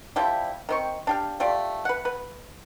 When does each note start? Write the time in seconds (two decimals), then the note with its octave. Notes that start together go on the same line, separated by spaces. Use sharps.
0.16 F3 G3 E4 G4
0.69 D#3 C4 C#6
1.07 D4 G4 F5
1.40 A3 F4 G4 D5
1.85 B4 F#5
2.05 B4